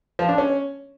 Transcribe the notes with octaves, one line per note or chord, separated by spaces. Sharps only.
F3
D4
C#4